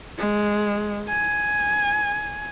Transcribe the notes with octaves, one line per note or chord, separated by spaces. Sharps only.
G#3
G#5